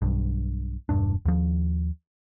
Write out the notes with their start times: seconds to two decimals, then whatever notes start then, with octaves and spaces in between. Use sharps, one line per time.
0.02 B1 G2
0.89 E1 G2 D4
1.26 D#2 F3